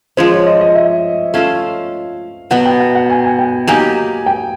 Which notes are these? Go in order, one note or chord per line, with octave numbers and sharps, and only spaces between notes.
F3 G#3 C#4 C5
C#5
D#5
D#5
E5
A3 C#4 F4 A4 F5
B2 F#3 B3 F#5
G5
F#5
F#5
G#5
G#5
G5
F#3 A#3 D#4 G4 G#5
G5